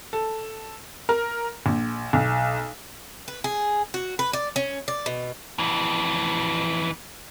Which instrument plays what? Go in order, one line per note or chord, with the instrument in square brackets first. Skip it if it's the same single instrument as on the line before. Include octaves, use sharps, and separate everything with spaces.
[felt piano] A4
A#4
A#1
B1
[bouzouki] B4
G#4
F#4
B4
D5
C#4
D5
B2
[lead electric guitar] F2 E3